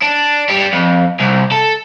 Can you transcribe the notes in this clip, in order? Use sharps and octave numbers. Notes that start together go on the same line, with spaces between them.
D4
G3 D4
F2
C2
A4